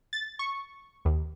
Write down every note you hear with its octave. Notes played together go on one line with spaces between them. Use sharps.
A6
C#6
D#2